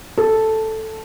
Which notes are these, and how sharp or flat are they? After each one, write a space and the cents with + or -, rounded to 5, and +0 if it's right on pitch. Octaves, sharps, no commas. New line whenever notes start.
A4 +0